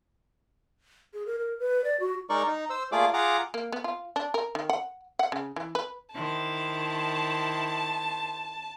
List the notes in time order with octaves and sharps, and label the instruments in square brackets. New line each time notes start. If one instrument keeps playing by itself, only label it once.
[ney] G#4
A#4
A#4
B4
D5
F#4
[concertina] G#3 D#4 A#4 D5 C#6
D#4
C5 E6
A3 A#3 F4 G#4 D5 D6
F4 G#4 F#5 A#5 D6
[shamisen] A#3
B3
F4
D4
A#4
D#3
F#5
F#5
C#3
E3
B4
[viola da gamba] D#3 E4 C5 [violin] A5